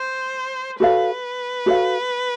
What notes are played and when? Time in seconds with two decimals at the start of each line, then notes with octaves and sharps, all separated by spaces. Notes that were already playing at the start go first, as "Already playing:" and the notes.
Already playing: C5
0.80 F#4 A4 B4 C#5 F5
1.66 F#4 A4 C#5 F5